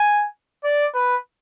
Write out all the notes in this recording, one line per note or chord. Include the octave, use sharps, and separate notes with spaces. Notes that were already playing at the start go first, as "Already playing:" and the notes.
Already playing: G#5
D5
B4